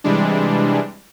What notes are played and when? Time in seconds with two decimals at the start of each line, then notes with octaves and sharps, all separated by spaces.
0.04 C3 E3 G3 G#3 D4